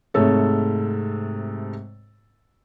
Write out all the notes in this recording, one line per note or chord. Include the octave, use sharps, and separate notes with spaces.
G#2 C3 A3 A4 C#5